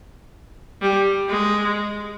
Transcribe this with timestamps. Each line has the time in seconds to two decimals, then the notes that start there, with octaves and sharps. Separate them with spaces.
0.82 G3
1.29 G#3